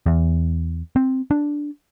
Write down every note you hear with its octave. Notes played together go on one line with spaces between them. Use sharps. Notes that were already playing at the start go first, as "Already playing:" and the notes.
E2
C4
D4